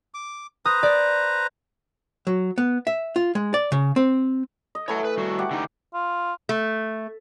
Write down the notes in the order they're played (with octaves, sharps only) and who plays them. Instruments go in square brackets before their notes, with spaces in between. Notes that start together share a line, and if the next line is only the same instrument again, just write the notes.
[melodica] D6
[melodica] B4 C5 A#5 [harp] D#6
[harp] D5
[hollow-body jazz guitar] F#3
B3
E5
F4
G#3
D5
C#3
C4
[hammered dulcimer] D#5
[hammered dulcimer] E3 A3 [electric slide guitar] C#5 F#5
[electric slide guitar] B4
G3 F#4
[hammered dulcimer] G4 F#5 D6
[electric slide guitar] D3 D#4
[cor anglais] F4
[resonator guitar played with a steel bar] A3